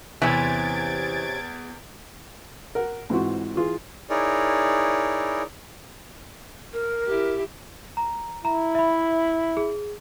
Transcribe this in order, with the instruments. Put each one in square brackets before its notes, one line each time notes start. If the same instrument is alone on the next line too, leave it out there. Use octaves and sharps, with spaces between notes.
[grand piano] E2 [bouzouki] C3 C#4 [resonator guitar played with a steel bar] E3 [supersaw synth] G#6 A6 D7
[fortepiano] A#4 F#5
G#2 E3 C4 F4 F#4
E3 F4 G#4
[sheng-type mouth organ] D#4 E4 G#4 A#4 C#5 D5
[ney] A#4
[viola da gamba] E4 G4
[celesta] A#5
[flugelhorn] E4 [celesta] A#5
[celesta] E5 B5
G#4